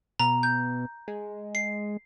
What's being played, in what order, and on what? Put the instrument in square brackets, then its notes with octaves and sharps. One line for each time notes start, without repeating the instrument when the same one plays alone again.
[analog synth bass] B2 [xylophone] A#5
[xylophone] G6
[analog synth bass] G#3
[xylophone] C7